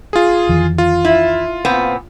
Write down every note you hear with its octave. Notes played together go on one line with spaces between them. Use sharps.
F4 G#4
F2 D#3 E3
F4
E4
A#2 B3 C4